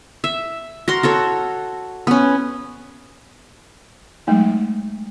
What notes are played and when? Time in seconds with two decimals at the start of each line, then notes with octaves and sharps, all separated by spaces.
0.24 E5
0.88 F#4 A#4 C6
1.03 F#4 A4 C#5
2.07 B3 C#4
4.27 F#3 G#3 A3 D#4